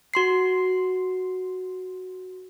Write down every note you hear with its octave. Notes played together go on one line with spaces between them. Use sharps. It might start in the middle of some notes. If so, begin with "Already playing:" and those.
F#4 C6 C7